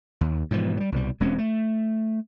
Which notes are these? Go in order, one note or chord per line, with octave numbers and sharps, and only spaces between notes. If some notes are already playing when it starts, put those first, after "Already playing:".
D#2
G#2 B2 E3 F3
F#3 G3
C2 B2 F#3 G3
E1 G#3 C4 C#4
A3